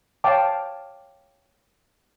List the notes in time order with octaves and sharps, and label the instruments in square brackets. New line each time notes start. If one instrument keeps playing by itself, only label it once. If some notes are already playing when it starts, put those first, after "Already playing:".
[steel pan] C#5 F5 G5 A5 D6